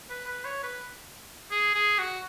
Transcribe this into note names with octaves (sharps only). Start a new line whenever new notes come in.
B4
B4
C#5
B4
G#4
G#4
F#4